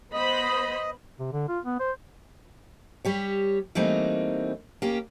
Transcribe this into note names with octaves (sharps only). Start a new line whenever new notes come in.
B3 C5 D#5 B5
C3
D3
F4
B3
C5
G3 G4 C#5
E3 G3 A3 A#3 C4 D#4
A#3 C#4 G4